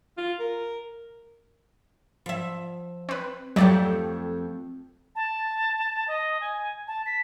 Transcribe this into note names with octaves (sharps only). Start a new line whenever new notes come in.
F4
A#4
F3 E5
C4 B4
F2 F#3 A3 G4 D5
A5
D#5
G#5
A5
B6